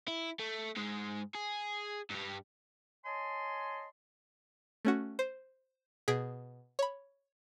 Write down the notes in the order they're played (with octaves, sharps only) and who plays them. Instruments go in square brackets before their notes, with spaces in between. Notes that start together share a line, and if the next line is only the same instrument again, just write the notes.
[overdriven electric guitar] E4
A3
G#2 G#3
G#4
G2 G3
[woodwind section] C#5 D#5 G#5 A5 C6
[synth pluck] A3 C#4 F#4
C5
B2 G#4 B6 D7
C#5 B5